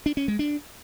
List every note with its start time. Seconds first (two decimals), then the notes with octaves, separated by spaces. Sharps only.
0.06 D4
0.17 C#4
0.28 G#3
0.39 D4